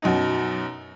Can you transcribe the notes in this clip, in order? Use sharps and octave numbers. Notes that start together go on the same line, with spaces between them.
F#2 B2 D#4